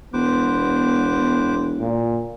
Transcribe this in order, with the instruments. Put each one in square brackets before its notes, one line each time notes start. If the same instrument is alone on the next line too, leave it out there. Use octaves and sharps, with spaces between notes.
[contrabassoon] E1 [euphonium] B3 [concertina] B4 C5 D6
[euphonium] A#2